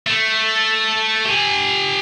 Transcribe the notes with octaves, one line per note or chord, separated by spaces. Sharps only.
A3
G4 G#5